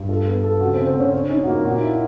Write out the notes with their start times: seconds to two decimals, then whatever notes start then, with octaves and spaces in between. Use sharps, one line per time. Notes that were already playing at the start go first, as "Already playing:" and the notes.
Already playing: G2
0.09 F4 A4
0.26 B3
0.43 A4
0.60 C#3 F#4
0.74 C4
0.79 C#3
0.87 C4
0.95 C#3 C#4
1.13 C#4 D4
1.30 C#4 D#4
1.43 F#4
1.47 A#3 F4
1.65 A#2 F#4
1.82 E4